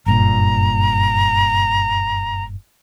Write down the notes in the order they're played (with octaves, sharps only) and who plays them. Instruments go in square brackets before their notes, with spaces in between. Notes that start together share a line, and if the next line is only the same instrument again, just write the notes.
[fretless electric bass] F#1 G2 A#2 [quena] A#5